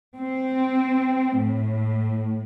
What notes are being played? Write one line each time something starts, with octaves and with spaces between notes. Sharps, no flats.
C4
A2